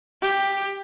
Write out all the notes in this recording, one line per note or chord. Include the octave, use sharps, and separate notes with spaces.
G4